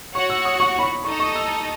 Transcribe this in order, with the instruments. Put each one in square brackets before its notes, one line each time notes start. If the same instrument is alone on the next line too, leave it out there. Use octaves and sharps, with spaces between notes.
[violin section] F#4 C#5 F#5 [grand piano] C#6
[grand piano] E6
D#6
C#6
B5
C#6
[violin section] D#4 A4 D#5 [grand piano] C#6
[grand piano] C#6
E6